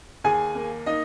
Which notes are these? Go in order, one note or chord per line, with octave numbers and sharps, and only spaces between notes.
D#2 G#4 G#5
A#3
A#3 D#4 D#5